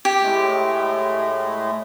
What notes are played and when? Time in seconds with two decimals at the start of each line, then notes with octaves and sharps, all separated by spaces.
0.05 G4
0.22 A2 G#3 A3